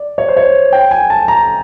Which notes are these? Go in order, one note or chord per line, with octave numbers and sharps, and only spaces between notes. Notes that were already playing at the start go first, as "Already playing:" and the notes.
Already playing: D5
C#5
C5
C#5
G5
G#5
A5
A#5